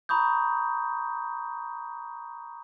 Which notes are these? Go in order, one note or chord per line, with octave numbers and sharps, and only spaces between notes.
A#5 B5 C#6 D#6 G6